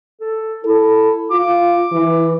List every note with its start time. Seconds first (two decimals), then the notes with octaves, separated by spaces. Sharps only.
0.21 A4
0.65 E4 A4
1.31 F4 D6
1.92 E3